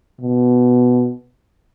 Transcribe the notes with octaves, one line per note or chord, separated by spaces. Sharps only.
B2